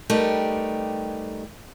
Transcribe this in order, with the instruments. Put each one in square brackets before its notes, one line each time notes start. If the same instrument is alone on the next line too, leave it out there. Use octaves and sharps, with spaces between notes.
[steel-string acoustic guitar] G3 A3 D#4 G4 A#4 B4